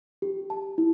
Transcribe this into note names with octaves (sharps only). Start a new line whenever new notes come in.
G4
A5
E4